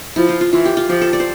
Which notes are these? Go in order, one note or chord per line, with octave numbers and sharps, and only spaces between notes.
F3 E4
F4
F4
E3 F4
G4
F4
F3 G4
A4
D5
C5